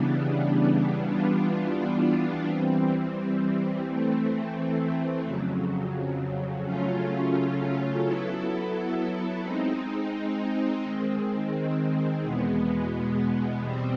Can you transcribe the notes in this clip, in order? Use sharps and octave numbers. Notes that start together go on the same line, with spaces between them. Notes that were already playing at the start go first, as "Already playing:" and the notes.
Already playing: C#3 E3 G3 B3 D4
E3 G3 B3 D4 F4
E3 G3 C4
E3 A3 C4
F2 C#3 F#3
C#3 F#3 A3 C#4 F4
F#3 B3 E4 A4
G#3 C4 D#4
D#3 G#3 C4
E2 B2 G#3 B3
B2 G3 C4